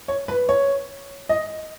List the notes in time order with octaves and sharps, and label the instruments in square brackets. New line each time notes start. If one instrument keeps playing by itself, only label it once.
[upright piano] C#5
B4
C#5
D#5